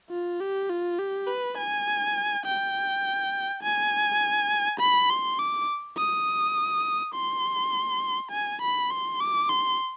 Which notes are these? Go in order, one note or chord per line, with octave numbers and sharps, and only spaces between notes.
F4
G4
F4
G4
B4
G#5
G5
G#5
B5
C6
D6
D#6
C6
G#5
B5
C6
D6
C6